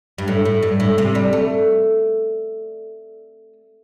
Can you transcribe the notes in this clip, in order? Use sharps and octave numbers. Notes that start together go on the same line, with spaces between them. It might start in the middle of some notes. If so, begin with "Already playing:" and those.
G2
A2
A2
G2
A2
C3
G3
A3